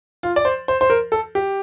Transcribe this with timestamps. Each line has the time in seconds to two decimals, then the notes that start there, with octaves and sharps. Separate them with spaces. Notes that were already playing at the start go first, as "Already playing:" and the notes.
0.23 F4
0.36 D5
0.45 C5
0.68 C5
0.81 C5
0.90 A#4
1.12 A4
1.35 G4